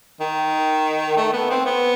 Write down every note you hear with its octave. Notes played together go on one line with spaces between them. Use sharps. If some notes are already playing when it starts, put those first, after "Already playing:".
D#3
A3
B3
C4
B3